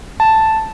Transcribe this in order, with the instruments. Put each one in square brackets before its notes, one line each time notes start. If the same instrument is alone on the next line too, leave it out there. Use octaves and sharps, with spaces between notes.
[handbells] A5